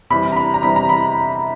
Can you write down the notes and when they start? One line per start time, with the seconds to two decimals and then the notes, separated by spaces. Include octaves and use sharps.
0.10 C3 E3 G3 B5
0.32 A#5
0.36 B5
0.54 A#5
0.63 C3 E3 G3 B5
0.76 A#5
0.89 B5